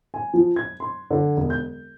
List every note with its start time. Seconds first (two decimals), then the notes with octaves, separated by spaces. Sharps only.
0.14 G#5
0.34 F3
0.56 G#6
0.80 C6
1.11 D3
1.37 E1
1.50 G6